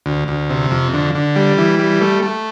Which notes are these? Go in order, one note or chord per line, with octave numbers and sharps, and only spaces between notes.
D2
D2
C3
F2
D3
D3
G3
E3
G3
A3
A3